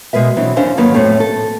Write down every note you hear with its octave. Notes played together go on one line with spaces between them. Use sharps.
B2 G#3 A#4 B4 E5
E3 F#3 C4 D4 E4
D#2 E3 C#4 D4 C5 F5
G#2 D#3 F#3 A#3 B4
F2 A2 A3 C4 C#5
A4